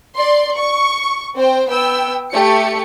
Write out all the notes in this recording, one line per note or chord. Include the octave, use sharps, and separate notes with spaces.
D5 C6
C#6
C4 C5 G5
B3 G5 E6
A3 G4 C#7